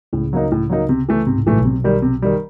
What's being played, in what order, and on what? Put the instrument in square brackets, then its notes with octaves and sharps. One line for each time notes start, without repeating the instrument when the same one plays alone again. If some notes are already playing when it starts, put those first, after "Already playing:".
[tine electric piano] C#2 C#3 [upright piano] A2
[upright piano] F#3 A#3 D#4
A2
F#3 A#3 D#4
C3
E3 A3
[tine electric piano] G#2 [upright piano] C3
[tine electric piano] A2
[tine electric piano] A#1 A#2 [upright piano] E3 A3
[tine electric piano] B1 B2
[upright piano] C3
D#3 G3
C3
D#3 G3